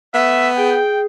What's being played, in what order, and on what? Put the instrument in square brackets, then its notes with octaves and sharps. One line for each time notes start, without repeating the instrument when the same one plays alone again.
[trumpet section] A3 E5 [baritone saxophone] B3
[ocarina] G#4 [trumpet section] G5